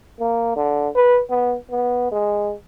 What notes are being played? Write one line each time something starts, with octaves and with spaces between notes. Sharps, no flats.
A#3
D3
B4
B3
B3
G#3